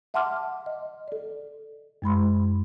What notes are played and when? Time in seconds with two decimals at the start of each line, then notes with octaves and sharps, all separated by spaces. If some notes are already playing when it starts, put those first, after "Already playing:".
0.14 E5 F#5 A5 C6 D6 F6
0.66 D#5
1.08 A4 D5
2.02 F#2 G#3 B5 C6